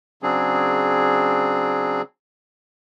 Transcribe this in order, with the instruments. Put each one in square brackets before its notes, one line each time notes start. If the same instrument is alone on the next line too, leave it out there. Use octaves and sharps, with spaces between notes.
[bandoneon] C#3 F#3 C4 D4 G#4